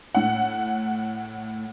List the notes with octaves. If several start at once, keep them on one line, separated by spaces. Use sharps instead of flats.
A2 F#5